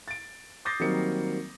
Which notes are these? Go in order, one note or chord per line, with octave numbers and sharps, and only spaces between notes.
A6 D7
D6 D#6 G6 A6 A#6 C7
D#3 F#3 G3 A#3 C4 C#7